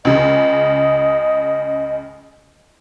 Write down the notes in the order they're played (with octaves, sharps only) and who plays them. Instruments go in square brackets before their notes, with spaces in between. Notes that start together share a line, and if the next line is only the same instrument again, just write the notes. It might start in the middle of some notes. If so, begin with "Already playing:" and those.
[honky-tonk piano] C#2 C#3 [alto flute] D#5